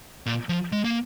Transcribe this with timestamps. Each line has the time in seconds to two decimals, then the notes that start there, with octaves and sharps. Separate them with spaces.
0.26 A#2
0.49 F3
0.72 G#3
0.85 A#3